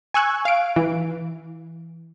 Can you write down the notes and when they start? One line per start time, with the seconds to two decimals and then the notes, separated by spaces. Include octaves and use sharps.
0.14 G#5 C#6 E6 F#6 G#6
0.45 F5 D7
0.76 E3